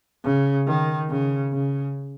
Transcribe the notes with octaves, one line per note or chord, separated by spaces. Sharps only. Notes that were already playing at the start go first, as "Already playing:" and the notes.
C#3
D#3
C#3
C#3